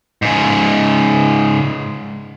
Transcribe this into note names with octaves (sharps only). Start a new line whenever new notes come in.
G#2 C#3